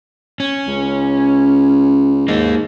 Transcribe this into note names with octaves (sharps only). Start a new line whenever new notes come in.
C#4
C#2
G#2 A#3 D#4